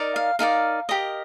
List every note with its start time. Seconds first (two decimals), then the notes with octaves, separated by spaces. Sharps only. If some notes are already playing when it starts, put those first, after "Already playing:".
Already playing: D#4 A#4 D5
0.16 F5
0.39 D#4 A#4 D5 F5
0.89 G4 A#4 D#5